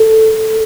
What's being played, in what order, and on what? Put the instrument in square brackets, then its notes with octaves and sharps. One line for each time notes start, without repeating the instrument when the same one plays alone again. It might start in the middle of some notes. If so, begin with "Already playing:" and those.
Already playing: [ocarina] A4